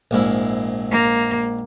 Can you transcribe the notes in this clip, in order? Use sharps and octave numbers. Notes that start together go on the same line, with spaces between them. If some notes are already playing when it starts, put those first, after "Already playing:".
A#1 G#2 E4
A#3